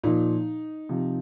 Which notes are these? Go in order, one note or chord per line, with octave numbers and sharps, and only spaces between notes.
A#2 F3 D#4
C3 F3